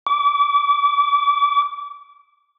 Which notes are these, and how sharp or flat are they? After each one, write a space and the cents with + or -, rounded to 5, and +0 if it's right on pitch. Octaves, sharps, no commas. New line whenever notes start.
D6 -30